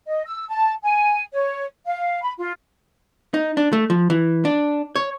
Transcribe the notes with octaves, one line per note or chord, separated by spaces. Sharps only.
D#5
E6
A5
G#5
C#5
F5
B5
F4
D#4
D4
A3
F3
E3
D4
C#5